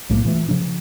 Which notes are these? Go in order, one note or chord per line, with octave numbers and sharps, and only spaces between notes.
B1 A2 A3 A#3
A#2 E3 G#3 A3
C#3 F3 D4